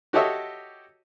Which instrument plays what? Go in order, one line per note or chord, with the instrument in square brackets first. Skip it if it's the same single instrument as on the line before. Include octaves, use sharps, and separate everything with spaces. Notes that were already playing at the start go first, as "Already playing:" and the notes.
[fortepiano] F#4 G4 A4 C#5 D#5 E5